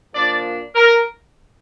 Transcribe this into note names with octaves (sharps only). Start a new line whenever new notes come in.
A#2 F3 A#3 D4 D5
A#4